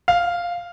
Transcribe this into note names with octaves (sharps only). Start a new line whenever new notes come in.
F5